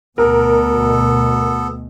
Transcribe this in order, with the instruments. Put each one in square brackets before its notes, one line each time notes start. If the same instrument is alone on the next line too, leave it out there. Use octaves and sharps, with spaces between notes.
[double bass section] D2 B2 [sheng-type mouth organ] B3 A4 [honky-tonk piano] A#4